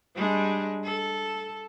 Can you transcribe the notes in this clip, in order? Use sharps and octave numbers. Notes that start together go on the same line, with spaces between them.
G3 G#3 D4
A4